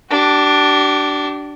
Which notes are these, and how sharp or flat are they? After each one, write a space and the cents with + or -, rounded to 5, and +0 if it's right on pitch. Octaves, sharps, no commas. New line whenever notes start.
D4 +0 G4 -40